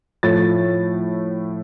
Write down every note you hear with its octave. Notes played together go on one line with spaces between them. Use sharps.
A2 F3 A3 A6